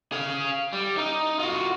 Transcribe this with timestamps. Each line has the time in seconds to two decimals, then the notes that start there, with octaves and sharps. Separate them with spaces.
0.12 G#4 F5
0.73 G3
0.98 D#4
1.39 F4 F#4